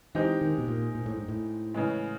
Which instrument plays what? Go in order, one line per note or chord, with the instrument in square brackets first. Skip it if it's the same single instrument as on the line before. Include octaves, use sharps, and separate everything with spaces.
[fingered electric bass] E3 [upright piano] G#3 C4 D#4 G4
[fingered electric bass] D#3
B2
A#2
A#2
A2
G#2
A2
[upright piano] C#3 E3 G#3